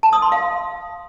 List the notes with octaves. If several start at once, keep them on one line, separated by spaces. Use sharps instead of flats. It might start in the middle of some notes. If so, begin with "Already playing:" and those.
A5
D#6
C6
F5